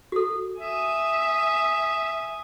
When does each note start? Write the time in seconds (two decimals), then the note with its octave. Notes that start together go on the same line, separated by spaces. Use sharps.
0.12 F#4 A4
0.61 E5 G#5 D#6